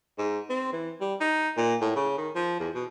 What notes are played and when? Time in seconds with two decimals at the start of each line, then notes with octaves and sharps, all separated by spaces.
0.18 G#2
0.50 C4
0.73 E3
1.01 G3
1.21 D#4
1.57 A#2
1.82 A2
1.96 C#3
2.18 D#3
2.36 F3
2.60 E2
2.75 B2